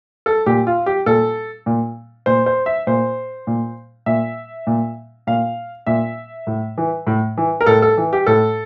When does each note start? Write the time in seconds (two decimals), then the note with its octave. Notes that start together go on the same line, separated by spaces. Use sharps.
0.26 A4
0.46 A#2 G4
0.67 F4
0.86 G4
1.06 A#2 A4
1.66 A#2
2.26 A#2 C5
2.46 C5
2.66 E5
2.87 A#2 C5
3.47 A#2
4.06 A#2 E5
4.67 A#2
5.27 A#2 F5
5.86 A#2 E5
6.47 A2
6.78 E3
7.07 A2
7.37 E3
7.61 A#4
7.66 A2 A4
7.82 A4
7.98 E3
8.13 G4
8.27 A2 A4